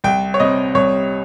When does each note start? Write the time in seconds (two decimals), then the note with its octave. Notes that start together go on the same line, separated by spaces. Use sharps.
0.04 C2 G5
0.34 C#5
0.40 C3 G3 C4 D#5
0.75 C2 C#5